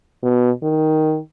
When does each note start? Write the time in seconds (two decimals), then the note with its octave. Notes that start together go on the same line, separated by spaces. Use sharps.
0.23 B2
0.63 D#3